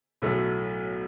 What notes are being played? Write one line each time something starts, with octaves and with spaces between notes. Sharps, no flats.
B1 A2 F#3 A3